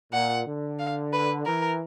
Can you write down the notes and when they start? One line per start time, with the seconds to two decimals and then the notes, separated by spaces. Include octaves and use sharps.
0.12 A#2 F#5
0.46 D3
0.79 F5
1.13 B4
1.46 E3 A#4